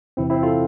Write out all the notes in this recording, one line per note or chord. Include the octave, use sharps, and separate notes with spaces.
E2 C3 E3 C4 E4
C4 E4
F4 A4